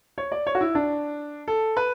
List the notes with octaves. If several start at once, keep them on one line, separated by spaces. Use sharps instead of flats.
C#5
D5
C#5
F#4
E4
D4
A4
B4